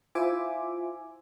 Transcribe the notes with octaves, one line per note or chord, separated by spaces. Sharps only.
E4 F4 C5 E5 G#5 D6